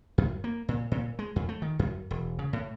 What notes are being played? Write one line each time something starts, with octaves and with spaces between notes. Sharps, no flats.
F#2
A#3
A#2
A#2
G#3
F2
A3
D#3
F#2
E1
C#3
A2